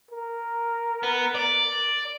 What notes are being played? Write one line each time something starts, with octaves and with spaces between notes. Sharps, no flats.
A#4
B3
D5